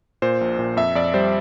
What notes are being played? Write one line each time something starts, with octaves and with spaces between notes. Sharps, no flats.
A#2 C5
A#1
A#2
F2 E5
F2 D5
G3 C5